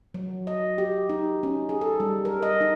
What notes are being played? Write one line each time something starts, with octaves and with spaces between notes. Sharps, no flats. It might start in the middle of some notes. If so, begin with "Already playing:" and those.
F#3
D#5
G4
D#4
C#4
G#4
A4
G3
A#4
D#5
D#4